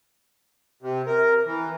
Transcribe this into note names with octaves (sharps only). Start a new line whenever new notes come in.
C3
A#4
E3